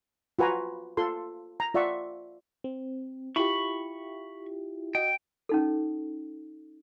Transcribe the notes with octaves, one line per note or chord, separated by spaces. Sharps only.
F4 F#4 B4 G#5 A#5
F4 A4 C6
A#5
F4 D5 E5 F#5 C#6
C4
E4 F4 G4 B5 C#6
F#4 D#5 G5
C#4 D#4 A4